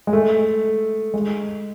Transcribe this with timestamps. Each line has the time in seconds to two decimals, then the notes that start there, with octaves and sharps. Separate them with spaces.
0.07 G#3
0.13 A3
1.14 G#3